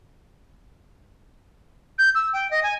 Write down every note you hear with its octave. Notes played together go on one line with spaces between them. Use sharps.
G6
E6
G5
D#5
G#5